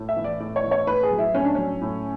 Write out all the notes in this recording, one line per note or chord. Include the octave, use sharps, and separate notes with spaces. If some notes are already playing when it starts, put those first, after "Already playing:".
Already playing: A2
E5
E3
D5
A2 D5
C#5
E3
C#5
A2 B4
G#4
F#3
E4
A2 C#4
D4
F#3 C#4
A2